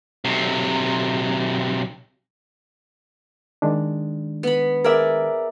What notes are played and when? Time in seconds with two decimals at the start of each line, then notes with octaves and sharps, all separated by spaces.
0.25 B1 C3
3.62 D#3 G#3 D4
4.43 B3 B5
4.84 G#4 A#4 D5 E5